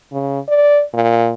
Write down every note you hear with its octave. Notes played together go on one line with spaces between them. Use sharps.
C#3
D5
A#2